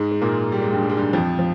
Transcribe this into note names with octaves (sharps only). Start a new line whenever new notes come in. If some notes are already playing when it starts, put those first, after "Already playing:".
Already playing: G#2 G#3
G#3
A#2 A#3
G3
G#3
G2 G3
G3
G#3
G2 G3
F2 F3
F3